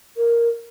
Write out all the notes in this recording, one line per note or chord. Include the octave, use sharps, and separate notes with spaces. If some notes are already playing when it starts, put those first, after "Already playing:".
A#4